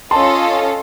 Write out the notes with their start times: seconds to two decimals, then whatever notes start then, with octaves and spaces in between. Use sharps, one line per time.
0.11 C#4 F4 A4 D#5 A5 C6